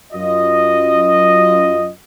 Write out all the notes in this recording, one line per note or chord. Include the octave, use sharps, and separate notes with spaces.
F#2 F4 D#5